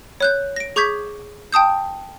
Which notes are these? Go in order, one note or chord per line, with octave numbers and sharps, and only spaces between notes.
C#5 F#6 G6
A#6 D7
G#4 C#6 D6 G6 G#6 B6
G5 A5 D#6 G6